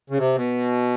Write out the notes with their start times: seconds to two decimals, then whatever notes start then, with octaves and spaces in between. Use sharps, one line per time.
0.10 C#3
0.18 C3
0.35 B2